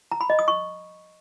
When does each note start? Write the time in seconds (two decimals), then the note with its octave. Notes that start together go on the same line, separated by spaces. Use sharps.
0.12 A#5
0.21 B5
0.30 D#5
0.39 D#6
0.48 C#6